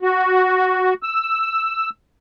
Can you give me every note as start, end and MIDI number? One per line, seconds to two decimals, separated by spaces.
0.02 0.94 66
1.03 1.90 88